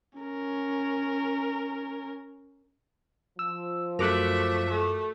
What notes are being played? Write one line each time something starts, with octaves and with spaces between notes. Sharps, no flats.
C#4 A#4
F3 E6
F#2 A3 F#4 A#4 E5 D6 F#6
A3